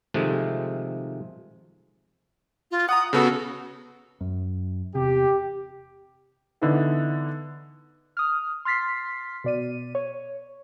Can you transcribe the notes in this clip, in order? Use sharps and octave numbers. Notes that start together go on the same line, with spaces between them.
C3 D#3 F3 G#3 A3
F4
F#5 A#5 D#6
C#3 B3 F#4 A4
F#2
E1 C3 G4
D3 E3 B3 D#4 E4 A4
D#6 F6
C6 F6 A6 B6 C7
B2 D5 D#7
C#5